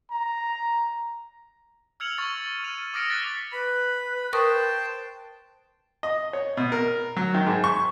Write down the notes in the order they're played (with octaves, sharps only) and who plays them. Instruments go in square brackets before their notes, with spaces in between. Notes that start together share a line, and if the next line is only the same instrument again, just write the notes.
[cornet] A#5
[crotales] E6 F6 G#6 C#7 F7 F#7
C#6 A6
F6 D#7 F7
D6 D#6 F6 A#6 C#7 D7
F#6 A6 B6
[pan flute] B4 [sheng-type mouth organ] B5
[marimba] A#4 C#6 D#6 [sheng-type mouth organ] C5 G5 A5
[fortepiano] D#5
C#5
B2
A#4
F#3
D#3
G#2
C#6